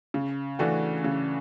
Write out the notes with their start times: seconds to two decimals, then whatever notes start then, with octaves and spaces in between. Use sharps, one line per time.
0.14 C#3
0.59 E3 A3 D4 F#4
1.04 C#3